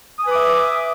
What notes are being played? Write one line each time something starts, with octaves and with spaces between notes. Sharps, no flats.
B4 E5 G#5 D6 D#6